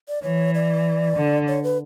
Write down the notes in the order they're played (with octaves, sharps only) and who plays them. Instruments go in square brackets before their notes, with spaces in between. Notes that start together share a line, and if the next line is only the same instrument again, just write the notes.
[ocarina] D5
[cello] E3 [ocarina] C#5
[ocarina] D5
[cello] D3
[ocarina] C#5
B4